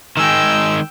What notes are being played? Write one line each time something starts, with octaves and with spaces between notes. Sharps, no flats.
D#3 G#3 G5 E6